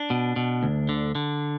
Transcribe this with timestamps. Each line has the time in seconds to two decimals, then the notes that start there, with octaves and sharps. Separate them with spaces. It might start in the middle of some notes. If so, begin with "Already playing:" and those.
Already playing: D4
0.10 B2
0.36 B2
0.63 D2
0.89 D3
1.15 D3